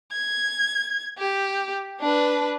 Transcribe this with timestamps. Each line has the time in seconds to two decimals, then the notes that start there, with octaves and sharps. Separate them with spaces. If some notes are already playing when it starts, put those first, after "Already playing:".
0.12 G#6
1.18 G4
2.00 D4 B4